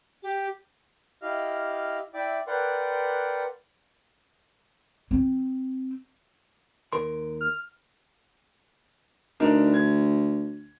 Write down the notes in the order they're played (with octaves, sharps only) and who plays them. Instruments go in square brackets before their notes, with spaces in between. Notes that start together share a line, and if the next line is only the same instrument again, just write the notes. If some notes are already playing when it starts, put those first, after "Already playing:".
[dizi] G4
[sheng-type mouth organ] E4 G4 D#5 F5 F6
E4 D5 E5 G5 D6
A#4 B4 D5 F#5 G5 C6
[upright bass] C4
[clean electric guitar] D#2 A#4 C6
[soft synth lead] F6
[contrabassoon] D2 [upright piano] D4 D#4 A#4
[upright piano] G#6